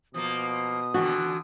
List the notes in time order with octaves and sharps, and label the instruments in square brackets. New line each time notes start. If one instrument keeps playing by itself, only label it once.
[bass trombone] B2 [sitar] F3 A#3 [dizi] D#6
[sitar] E2 D3 D#3 [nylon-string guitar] F#4